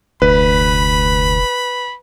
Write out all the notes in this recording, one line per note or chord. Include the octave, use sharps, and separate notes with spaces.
F1 D2 B4 B5